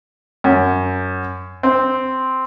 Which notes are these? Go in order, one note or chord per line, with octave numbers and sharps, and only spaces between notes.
F#2
C4